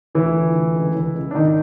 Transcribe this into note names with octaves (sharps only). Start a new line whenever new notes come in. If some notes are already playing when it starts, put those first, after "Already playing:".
D2 E3 E4
F3
D2
C#2
E3
C#2
D4
G#1 D#3 D#4